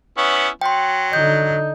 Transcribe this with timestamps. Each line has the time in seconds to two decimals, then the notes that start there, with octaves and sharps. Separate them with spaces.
0.17 B3 C#4 E4
0.61 F#3 G5 C6
1.13 D3 D#4 G6